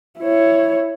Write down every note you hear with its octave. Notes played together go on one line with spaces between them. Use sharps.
E4 C#5